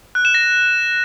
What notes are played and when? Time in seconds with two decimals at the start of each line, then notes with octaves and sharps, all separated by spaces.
0.15 F#6
0.25 E7
0.34 A#6